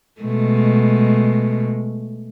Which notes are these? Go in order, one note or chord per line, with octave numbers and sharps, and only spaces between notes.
B2 G#3 A3